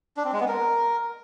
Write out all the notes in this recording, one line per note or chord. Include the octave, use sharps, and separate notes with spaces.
D4
C4
G#3
B3
A#4